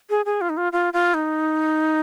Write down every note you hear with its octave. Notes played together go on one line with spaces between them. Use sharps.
G#4
G#4
F4
D#4
F4
F4
F4
D#4